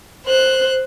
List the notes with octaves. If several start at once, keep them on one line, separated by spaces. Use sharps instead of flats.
C5 F#6